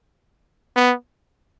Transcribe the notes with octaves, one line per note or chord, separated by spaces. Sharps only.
B3